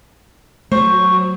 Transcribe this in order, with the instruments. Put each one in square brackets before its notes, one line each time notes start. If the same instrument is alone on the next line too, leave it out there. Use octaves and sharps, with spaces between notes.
[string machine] F#3 [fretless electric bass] A3 [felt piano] C5 [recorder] C#6